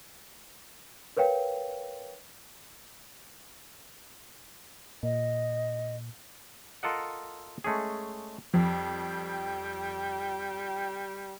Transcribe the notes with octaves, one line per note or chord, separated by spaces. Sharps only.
A#4 B4 C#5 F5 G5
A#2 D#5
F4 A4 A#4 D#5 F#5
G#3 A3 C#4 G#4
F2 F3 G3 G5